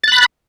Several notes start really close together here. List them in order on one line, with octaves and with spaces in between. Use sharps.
A6 F#6 B5